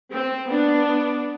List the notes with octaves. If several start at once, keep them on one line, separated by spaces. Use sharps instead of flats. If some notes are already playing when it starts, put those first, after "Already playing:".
C4
B3 D4